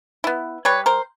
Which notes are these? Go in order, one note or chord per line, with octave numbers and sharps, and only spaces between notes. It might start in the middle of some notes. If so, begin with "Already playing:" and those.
B3 E4
G3 B4 C#5
A#4 C5